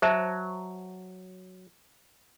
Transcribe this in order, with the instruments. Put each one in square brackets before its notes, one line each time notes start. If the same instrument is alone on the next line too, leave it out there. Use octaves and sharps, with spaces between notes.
[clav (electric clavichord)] F#3 [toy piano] C5 E5 A5